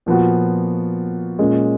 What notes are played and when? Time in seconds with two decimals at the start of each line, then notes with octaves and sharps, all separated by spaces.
0.06 A#2 F3 B3 F#4
1.39 A#2 G#3 C#4